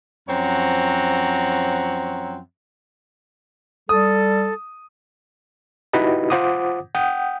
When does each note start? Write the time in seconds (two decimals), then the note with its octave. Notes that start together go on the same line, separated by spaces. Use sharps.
0.29 F#2 F3 C4 C#5 F#5 A#5
3.89 G3 A4 D#6
5.93 D#4 E4 F#4 G4 B4 D#5
6.30 F4 C5 F#5 D6 D#6
6.95 F#5 G5 D#6 G6